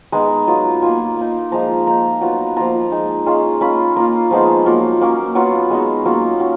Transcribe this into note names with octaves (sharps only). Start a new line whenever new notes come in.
G#3 B3 D#4 A#5
F#3 B3 F4
A#3 F4 G#5
A#3 D#4
F3 G#3 D#4 A#5
A#3 D#4 A#5
F#3 B3 F4
F3 A#3 F4 A#5
G#3 D#4
G#3 C#4 F4
A#3 C#4 F4 B5
A#3 F4 A#5
F3 G#3 B3 D#4
F#3 A#3 F4
F#3 A#3 C#4
F#3 B3 F4
G#3 B3 D#4
F#3 A#3 C#4 F4
F#3 C#4